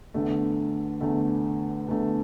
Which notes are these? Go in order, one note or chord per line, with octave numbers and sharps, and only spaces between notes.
E2 D3 A3
E2 D3 A3
E2 D3 A3